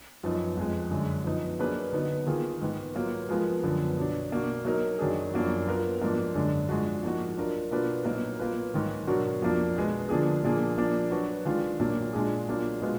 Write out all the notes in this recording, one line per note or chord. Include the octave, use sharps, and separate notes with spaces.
F#2 F3 B3 D#4
F2 F3 G#3
F#2 D3 G#3
F3 B3 D#4
F#3 A#3 D4 G#4 B4
D3 F#3 B3 D#4
D#3 A#3 F4 G#4
G#2 D#3 G#3 B3
F#3 A#3 F4 B4
F3 G#3 B3 F4 A#4
F#2 D3 F3 B3
B2 F#3 D4
B2 A#3 D4 F#4
F#3 A#3 D#4 A#4
F#2 D#3 F#3 D4 G#4
F#2 F3 A#3 D4 F#4
F#3 B3 F4 A#4
G#2 F3 A#3 D4
F#2 D3 G#3 D4
G#2 F3 G#3 D4 F#4
F3 A#3 D#4 F#4
F#3 D4 F4 A#4
B2 A#3 D4 F4 B4
A#2 F#3 A#3 D#4 A#4
F#3 A#3 F4 B4
G#2 D#3 F#3
B2 F#3 D4 F#4 A#4
F2 F3 A#3 D4
B2 G#3 B3
D3 F3 A#3 D4 G#4
A#2 F3 A#3 D4 G#4
F3 A#3 D4
F#3 D4 F#4 B4
D#3 G#3 D4 F4
A#2 F#3 A#3 D4
A#2 G#3 D4 F4 G#4
F#3 A#3 D4 F4
B2 G#3 B3 F4